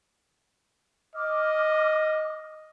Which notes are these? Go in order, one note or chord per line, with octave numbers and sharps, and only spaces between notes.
D#5 D6 F6